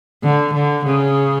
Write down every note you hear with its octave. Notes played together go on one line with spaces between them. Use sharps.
D3
D3
C#3